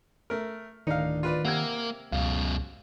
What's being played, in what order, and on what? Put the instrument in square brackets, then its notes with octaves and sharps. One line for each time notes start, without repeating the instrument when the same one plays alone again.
[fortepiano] A3 A#4 [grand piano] F6
[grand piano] D1 D4 C#7 [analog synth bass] D#3 [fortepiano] D#4 F5
[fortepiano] F4 B4 D5
[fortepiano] C3 [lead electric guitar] A#3 [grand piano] F#5 E6 G#6
[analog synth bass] C#2 [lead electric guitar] F#2 B2 [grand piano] F5